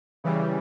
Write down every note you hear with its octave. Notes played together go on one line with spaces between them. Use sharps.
C#3 E3 G3